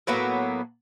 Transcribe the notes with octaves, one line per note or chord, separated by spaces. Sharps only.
A2 F#3 A#3 B3